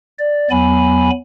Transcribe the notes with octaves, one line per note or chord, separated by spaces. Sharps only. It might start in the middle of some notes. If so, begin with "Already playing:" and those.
D5
E2 F#3 B3 G#5 B5